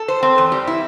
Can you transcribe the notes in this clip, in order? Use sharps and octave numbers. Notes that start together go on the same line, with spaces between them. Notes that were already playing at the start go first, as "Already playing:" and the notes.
Already playing: A4
C5
C4
E2
G3
E4